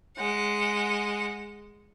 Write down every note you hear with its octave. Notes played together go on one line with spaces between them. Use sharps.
G#3 F#5